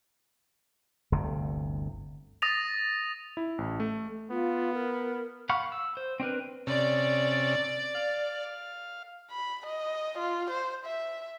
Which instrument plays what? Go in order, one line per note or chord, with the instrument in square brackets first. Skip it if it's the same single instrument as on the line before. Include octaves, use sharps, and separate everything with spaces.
[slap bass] G1 D2 C3
[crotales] D#6 A6 A#6 D#7 F7
[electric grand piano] E4
A1
A3
[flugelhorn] B3 [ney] F4
[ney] A#4
[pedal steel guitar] F5 F#5 B5 C#6 F6
E6
C5
C4 D4 A#4 B4
[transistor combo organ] C3 C#4 [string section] D5
[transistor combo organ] F5
[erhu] B5
D#5
F4
C5
E5